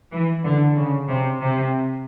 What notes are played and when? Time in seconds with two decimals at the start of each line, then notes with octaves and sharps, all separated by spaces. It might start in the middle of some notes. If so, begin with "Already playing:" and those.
0.13 E3
0.45 D3
0.77 C#3
1.09 C3
1.41 C3